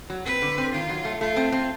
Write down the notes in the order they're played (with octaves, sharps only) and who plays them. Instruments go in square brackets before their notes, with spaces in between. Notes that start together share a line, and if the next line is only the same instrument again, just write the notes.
[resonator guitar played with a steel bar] F#3
[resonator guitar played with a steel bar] C4 [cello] B4
[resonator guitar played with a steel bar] D3
C4
[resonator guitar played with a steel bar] D#3 [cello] F4
[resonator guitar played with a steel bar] F#3
A3
[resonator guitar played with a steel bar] A3 [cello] F4
[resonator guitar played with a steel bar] C4
C4